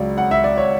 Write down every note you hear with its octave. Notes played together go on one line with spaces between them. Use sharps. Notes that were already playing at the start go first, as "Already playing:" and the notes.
Already playing: C#2 C#3 F#3 D5
F#5
E5
D5
C#5